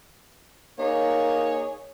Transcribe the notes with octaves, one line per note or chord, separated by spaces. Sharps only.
A#3 D#4 G#4 C#5